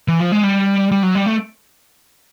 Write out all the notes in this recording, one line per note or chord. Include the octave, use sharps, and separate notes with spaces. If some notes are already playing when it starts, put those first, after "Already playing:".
E3
F3
G#3
G3
G3
F#3
G3
A3